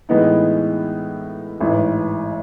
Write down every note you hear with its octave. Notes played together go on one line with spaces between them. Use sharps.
A2 E3 G#3 B3 D#4
A1 G#2 E3